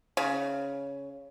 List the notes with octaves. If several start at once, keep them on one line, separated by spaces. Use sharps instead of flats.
C#3